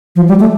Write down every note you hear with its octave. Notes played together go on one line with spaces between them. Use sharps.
F3
G3
A3